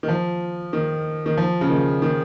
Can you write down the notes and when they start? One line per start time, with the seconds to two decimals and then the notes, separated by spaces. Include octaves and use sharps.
0.03 D#3
0.08 F3
0.73 D#3
1.26 D#3
1.37 F3
1.61 C#3
1.69 D#3
2.02 D#3